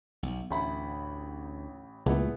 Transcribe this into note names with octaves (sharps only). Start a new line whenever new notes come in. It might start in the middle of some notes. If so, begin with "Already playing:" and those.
B1
A1 D2 E5 B5
C#2 A#2 G#3 A3 B3 E4